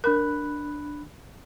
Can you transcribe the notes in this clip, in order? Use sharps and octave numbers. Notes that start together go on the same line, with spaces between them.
D4 A#4 B5 F#6